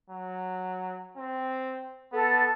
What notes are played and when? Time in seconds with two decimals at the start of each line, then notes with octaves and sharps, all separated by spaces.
0.10 F#3
1.17 C4
2.13 B3 A4